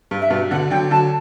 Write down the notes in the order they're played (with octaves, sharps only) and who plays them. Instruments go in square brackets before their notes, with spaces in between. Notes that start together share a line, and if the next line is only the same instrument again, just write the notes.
[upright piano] G2
[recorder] E5
[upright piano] G2 B2
[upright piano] B2 D3 [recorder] F#5
[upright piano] D3 F#3 [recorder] G5
[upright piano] D3 F#3 [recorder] A5